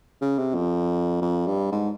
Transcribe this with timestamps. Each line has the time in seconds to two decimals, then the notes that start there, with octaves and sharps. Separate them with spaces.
0.21 C#3
0.39 C3
0.55 F2
1.22 F2
1.47 G2
1.72 G#2